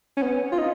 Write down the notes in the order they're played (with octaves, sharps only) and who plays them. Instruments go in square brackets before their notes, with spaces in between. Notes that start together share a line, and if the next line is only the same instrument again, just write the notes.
[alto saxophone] C#4
B3
F4
D#4